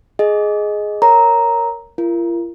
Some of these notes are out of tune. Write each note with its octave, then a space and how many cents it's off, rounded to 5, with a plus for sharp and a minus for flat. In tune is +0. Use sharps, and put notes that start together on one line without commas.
G#4 +10 D#5 +0
A#4 -5 C#5 +0 A#5 +0
F4 -45 A#4 +0